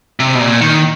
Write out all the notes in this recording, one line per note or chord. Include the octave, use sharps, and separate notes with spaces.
C3
B2
A#2
D#3